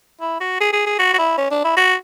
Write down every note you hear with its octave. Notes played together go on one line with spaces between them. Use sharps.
E4
F#4
G#4
G#4
G#4
F#4
F#4
E4
C#4
D4
E4
F#4